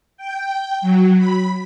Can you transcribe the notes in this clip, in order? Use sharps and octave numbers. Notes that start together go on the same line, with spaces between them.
G5
F#3
B5